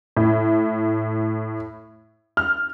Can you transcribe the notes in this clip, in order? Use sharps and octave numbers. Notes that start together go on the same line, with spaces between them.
A2
F6